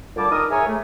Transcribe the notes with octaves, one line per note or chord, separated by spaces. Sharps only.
A#2 D3 G3 D5 A5 D6
D#3 A#4 D#6
G#4 A#4 C#5 E5 G#5
A3